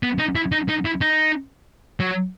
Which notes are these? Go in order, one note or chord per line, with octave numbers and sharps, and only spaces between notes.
B3
D#4
E4
D#4
D#4
E4
D#4
F#3